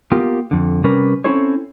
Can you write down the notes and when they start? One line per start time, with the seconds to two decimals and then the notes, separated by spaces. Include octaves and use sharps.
0.12 A#3 B3 F4 G4
0.51 F2 D3
0.84 C3 G3 C#4 A#4 B4
1.24 C4 C#4 E4 A4 C5 C#5